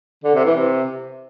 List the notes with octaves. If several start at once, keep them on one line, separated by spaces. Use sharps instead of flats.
D3
C3
E3
C3